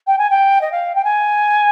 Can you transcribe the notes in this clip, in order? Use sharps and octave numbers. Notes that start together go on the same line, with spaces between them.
G5
G#5
G5
D#5
F5
G5
G#5